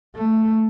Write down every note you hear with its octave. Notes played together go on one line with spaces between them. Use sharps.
A3